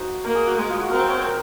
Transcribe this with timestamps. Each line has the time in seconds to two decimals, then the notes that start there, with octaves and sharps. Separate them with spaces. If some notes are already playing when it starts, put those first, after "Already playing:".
Already playing: D#4 F#4 C5
0.24 A#3 A#4
0.35 G#4
0.47 F#4
0.58 G#3
0.69 F4
0.81 F#4
0.91 C4 A#4
1.00 C5
1.08 C#5
1.17 C5
1.26 A#4